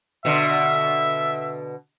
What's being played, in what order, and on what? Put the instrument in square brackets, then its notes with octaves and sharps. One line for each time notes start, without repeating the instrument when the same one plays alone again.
[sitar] B2 D3 [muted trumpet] E5